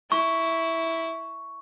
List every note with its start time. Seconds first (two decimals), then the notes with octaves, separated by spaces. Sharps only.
0.12 E4 C#6